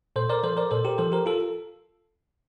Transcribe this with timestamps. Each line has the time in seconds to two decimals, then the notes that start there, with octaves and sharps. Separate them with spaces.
0.16 A#2 A4 C5
0.30 A#4 D5
0.43 F3 A4 C5
0.57 A#4 D5
0.71 A#2 A4 C5
0.85 G4 A#4
0.98 F3 A4 C5
1.12 G4 A#4
1.26 F4 A4